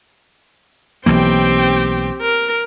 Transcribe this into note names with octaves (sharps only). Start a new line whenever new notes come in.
B1 E3 A#3 C4 G4
A#4